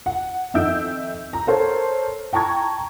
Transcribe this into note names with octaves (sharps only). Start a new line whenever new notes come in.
F#5
F2 D#3 E5 E6 G6 D7
A#5
A4 A#4 C5 C#5 A5
G5 A5 A#5 C#6 G#6